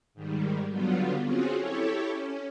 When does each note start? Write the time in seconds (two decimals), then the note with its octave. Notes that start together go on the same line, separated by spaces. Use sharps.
0.14 G#2 D#3 G3
0.68 D3 F#3 G3 B3 F4
1.23 C4 C#4 F4 F#4 G#4
1.57 E4 G4 A4 C#5
2.08 C#4